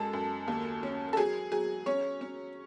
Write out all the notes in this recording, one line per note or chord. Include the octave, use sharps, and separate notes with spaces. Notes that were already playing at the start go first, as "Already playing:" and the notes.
Already playing: F#2 G#3 A4
F#2
D#2
C#4
A4
F#3 G#4
F#3 G#4
C#4 C#5
C#4